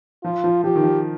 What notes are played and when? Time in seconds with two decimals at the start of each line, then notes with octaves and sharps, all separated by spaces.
0.24 F3 F4
0.44 F3
0.64 F3 G4
0.75 D#3
0.83 F3